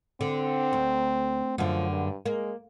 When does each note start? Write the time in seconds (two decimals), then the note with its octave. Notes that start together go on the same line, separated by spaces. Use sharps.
0.21 D3 C4
0.73 D2
1.58 F#2 D3 F3
1.90 G2
2.26 G#3 A#3